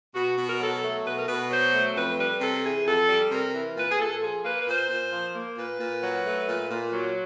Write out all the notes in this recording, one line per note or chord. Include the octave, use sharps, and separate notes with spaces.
B2 F#4
B2
A#4
F#3 A4
A3
B2 B4
A#4
B2 B4
F#3 C5
A3
F2 B4
G3 B4
C3 A4
E3 G#4
F2 A4
G3
C3 A#4
E3
A#2 B4
G#4
A#2 A4
F3 G#4
A#3 B4
B4
A#2 C5
A#2
F3
A#3
A#2 B4
A#2
F#3
A3
A#2
A#2
F#3